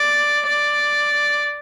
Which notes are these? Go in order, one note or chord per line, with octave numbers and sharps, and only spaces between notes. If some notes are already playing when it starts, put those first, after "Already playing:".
Already playing: D5
D5